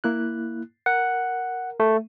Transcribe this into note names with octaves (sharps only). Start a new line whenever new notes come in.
A#3 E4 F#6
A#4 F#5
A3